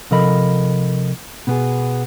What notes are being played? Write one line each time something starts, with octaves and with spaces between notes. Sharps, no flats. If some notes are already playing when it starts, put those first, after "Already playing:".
C3 F3 A4 A#4 D#5 B5
B2 B3 G#4